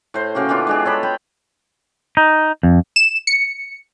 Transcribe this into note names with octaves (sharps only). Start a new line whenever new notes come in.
A2 C5
C#3 A#3 F#4 G4
E3 B3 D4 F4
G#3 D4 G#4
A4 C#5 D#5 B5
G5 B5 C6
D#4
F2
E7
C#7